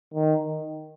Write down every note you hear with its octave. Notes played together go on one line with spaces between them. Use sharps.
D#3